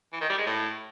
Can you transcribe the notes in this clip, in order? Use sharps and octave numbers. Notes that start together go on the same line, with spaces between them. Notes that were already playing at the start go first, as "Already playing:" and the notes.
E3
D#3
G3
G#3
A2